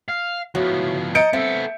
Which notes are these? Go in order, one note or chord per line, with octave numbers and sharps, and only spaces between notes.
F5
A2 F3 B3 F#4
D#5 A5 A#5 G6 C#7 D7
B3 C4 A4 E5